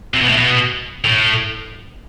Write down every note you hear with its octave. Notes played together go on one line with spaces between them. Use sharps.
C3
B2
A2
B2
A2